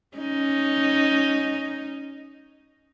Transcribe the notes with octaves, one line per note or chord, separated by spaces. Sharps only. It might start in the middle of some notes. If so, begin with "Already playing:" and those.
C#4 D#4